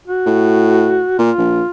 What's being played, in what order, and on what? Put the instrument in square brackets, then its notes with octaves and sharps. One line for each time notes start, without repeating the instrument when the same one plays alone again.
[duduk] F#4
[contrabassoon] A2
[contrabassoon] A#2 [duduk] F4
[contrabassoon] A#1